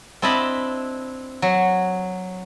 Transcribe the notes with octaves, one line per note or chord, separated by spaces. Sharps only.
C4 D4 E4 D#5 A5 B5
F#3